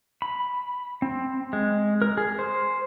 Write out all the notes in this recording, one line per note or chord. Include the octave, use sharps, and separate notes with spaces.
B5
C4
G#3
A#4
G#4
C5